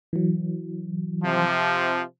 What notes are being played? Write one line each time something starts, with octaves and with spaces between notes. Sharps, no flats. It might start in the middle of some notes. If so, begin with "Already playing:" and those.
E3 F#3
C3 F3